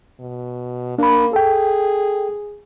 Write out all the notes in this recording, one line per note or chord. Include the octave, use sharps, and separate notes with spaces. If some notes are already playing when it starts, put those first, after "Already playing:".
B2
A#3 D4 B5
G#4 A4 G5